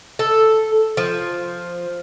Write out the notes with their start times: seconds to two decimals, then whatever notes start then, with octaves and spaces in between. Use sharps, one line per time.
0.19 A4
0.97 F3